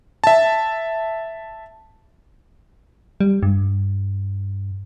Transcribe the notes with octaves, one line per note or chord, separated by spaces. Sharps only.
E5 A5
G3
G2